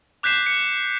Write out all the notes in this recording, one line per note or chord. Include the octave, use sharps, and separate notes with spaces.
D6 F#6 G6 B6 C7 E7
C#7